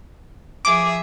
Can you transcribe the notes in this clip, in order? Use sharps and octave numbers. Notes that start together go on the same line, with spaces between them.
F3 G#4 E5 D6